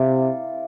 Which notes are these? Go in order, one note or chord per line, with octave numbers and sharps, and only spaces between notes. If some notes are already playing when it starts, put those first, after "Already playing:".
Already playing: C3 E4 A4 D5 F5